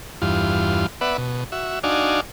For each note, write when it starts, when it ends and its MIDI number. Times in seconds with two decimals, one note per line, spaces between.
0.22 0.86 40
0.22 0.86 43
0.22 0.86 65
1.01 1.17 59
1.01 1.17 71
1.01 1.17 74
1.01 1.17 76
1.01 1.17 78
1.18 1.44 47
1.52 1.79 66
1.52 1.79 76
1.84 2.21 62
1.84 2.21 63
1.84 2.21 66
1.84 2.21 74
1.84 2.21 77
1.84 2.21 80